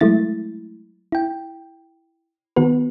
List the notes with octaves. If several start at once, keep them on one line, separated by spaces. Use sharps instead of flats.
F#3 G#3 A3 E4 A6
E4 G5
D#3 B3 F#4 B4